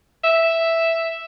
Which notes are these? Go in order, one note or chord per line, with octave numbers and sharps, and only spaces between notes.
E5